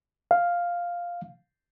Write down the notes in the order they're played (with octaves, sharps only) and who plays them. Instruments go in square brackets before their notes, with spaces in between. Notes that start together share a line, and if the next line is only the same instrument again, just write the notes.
[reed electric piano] F5